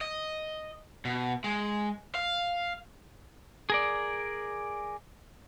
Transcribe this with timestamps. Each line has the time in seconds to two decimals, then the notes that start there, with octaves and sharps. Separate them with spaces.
0.01 D#5
1.05 B2
1.44 G#3
2.15 F5
3.70 G#4 A#4 D5